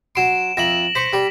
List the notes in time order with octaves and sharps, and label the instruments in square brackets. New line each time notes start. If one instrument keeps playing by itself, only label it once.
[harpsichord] F#3 C6 [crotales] D7 E7
[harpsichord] F2 E5 [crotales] A#6 F#7
[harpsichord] C5 C#6 [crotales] B6
[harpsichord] G3